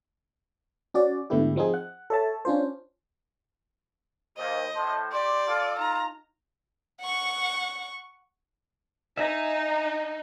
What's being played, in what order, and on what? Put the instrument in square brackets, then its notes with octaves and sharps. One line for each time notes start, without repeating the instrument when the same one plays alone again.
[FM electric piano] C#4 F#4 D5
G#2 D3 A3 B3 E4 G4
F3 C4 D#4 G#4
F#5
A4 C#5 E5 A5
C#4 D4 F4 C5
[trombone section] D#2 [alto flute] C5 [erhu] D#5
[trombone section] A2 C5 [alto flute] A5
[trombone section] G4 [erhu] D5 [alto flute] C6
[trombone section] F4 A4
[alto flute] D#4 [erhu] A#5
[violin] F#5 C#6
[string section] D#4 [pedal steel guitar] E5 G#5 A#5